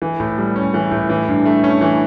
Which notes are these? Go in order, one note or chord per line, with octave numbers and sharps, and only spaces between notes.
E3
A2
G3
C#4
E3
A2
E3
G2
A3
C#4
E3